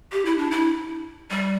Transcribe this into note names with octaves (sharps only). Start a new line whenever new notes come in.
G4
E4
D4
E4
G3